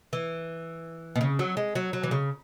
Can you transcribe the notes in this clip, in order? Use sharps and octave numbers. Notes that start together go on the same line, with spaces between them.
E3
B2
C#3
F#3
G#3
F#3
F#3
E3
C#3